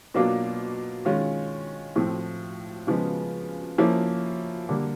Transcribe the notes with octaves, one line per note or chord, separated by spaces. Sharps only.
B2 F#3 A#3 D4 F4
D#3 G#3 C#4 F4
A2 F3 A3 C4
C#3 F3 G#3 B3
F3 A#3 C#4 E4
D3 G3 A#3